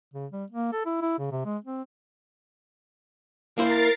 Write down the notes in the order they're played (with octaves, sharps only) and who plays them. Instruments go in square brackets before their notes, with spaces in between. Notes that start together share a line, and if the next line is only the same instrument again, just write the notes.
[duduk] C#3
G3
A#3
A4
E4
E4
C#3
C3
G#3
C4
[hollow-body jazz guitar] A#3 E4 C5 [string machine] A#4 A6 C7